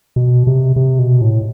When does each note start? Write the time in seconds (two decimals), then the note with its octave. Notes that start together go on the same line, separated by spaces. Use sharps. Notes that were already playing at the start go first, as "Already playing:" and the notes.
0.16 B2
0.47 C3
0.76 C3
0.99 B2
1.21 A2